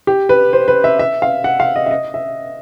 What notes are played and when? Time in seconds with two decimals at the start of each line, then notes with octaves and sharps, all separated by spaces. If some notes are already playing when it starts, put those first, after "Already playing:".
0.07 G4
0.29 B4
0.53 C5
0.68 B4
0.84 E5
0.99 E5
1.22 F5
1.44 F#5
1.60 F5
1.76 D#5
1.86 E5
1.91 D#5
2.14 E5